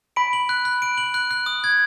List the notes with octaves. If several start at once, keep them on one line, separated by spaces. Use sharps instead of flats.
B5 D7
F#7
F#6
F#6
D7
F#7
F#6
F#6
D#6
G#6